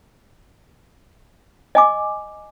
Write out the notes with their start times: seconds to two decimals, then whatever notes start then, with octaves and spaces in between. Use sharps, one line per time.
1.75 D#5 G#5 D6